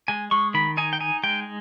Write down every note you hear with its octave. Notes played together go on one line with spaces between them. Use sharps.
G#3 G#5
G#3 C#6
D#3 B5
D#4 G#5
G5
D#4 G#5
G#3 G5